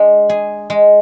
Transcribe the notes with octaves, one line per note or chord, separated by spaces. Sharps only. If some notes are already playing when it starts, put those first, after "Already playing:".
Already playing: G#3 D4
G#4
G#3